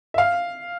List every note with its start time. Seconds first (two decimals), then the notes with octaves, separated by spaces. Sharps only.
0.14 E5
0.18 F5